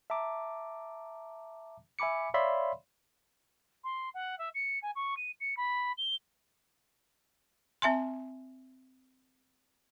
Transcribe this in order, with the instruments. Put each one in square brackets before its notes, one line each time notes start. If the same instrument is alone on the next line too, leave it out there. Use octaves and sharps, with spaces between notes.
[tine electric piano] E5 A5 A#5 D6
E5 G#5 B5 D6 C#7
C#5 D5 E5 F5 B5 C6
[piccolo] C6
F#5
E5
C#7
G#5
C#6
D#7
C#7
B5
G7
[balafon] C4 E5 G#5 C6